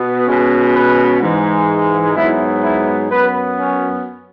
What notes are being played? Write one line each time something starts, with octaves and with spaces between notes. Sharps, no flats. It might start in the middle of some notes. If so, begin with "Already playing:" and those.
Already playing: B2 B3
B2 G#3 C#4
B4
G#2 E3 G#3
G#2 F#3 B3 E4
E4
F#2 F#3 B3 B4
C#4